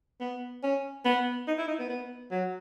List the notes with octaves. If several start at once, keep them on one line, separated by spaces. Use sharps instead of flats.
B3
C#4
B3
D#4
E4
D#4
B3
B3
F#3